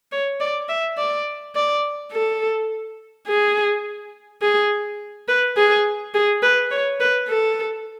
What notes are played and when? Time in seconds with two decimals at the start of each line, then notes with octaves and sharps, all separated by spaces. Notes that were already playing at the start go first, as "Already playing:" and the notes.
0.12 C#5
0.40 D5
0.69 E5
0.98 D5
1.55 D5
2.13 A4
3.28 G#4
4.42 G#4
5.28 B4
5.57 G#4
6.14 G#4
6.43 B4
6.71 C#5
7.00 B4
7.29 A4